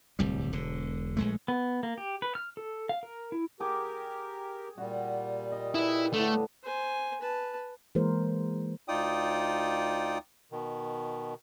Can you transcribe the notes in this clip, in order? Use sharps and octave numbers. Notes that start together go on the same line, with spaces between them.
D1 C2 G3
E1 D3
A#1 G#3 A3
B3
A#3
G4
B4
F6
A4
F5
A#4
E4
G4 G#4 A#4 G5 D6
A#2 G3 F#4
D#5
E4 G#4 B4 D#5
A2 D3 A3
C5 G#5
B4 A5
E3 G#3 A#3 A#4 C5
D2 D#4 F4 D5 G5 D#6
B2 D#3